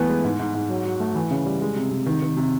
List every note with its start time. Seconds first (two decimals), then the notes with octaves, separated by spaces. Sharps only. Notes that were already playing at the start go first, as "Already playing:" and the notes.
Already playing: E3 A3 B3
0.09 G#3
0.24 G#2
0.39 G#2
0.55 G#2
0.70 F#3
0.85 F#3
1.00 A3
1.15 E3
1.31 C#3
1.46 G3
1.61 G#3
1.76 C3
1.91 C3
2.06 D#3
2.22 D#3
2.37 C3